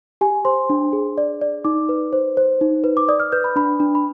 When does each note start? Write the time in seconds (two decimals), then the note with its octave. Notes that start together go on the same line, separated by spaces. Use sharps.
0.21 G4 G#5
0.45 C5 C6
0.70 D4
0.93 G#4
1.18 D5
1.41 D5
1.65 D#4 D6
1.89 B4
2.13 C5
2.37 C5
2.61 D#4
2.84 B4
2.97 D6
3.09 D5 D#6
3.20 F6
3.32 B4 G6
3.44 B5
3.56 D4 B5
3.80 D4
3.95 B5